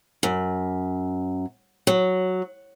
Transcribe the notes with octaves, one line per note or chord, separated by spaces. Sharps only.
F#2
F#3